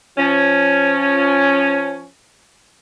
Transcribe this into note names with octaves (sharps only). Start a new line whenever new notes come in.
F3 C#4